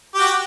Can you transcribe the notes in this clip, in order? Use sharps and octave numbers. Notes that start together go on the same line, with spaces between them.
F#4 G4 G5